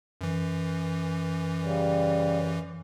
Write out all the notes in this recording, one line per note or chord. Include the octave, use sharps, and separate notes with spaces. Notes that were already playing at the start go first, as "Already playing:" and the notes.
F#2 E3
C#3 G3